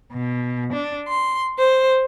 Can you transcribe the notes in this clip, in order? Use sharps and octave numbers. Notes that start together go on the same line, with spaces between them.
B2
D4
C6
C5